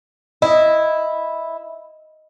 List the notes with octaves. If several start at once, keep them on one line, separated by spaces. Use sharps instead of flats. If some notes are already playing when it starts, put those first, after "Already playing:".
E4 D#5